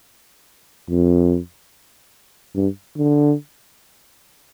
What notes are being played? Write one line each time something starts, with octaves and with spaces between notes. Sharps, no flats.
F2
G2
D3